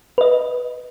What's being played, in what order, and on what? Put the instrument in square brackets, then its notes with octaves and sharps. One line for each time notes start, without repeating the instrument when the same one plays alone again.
[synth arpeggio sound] B4 D#5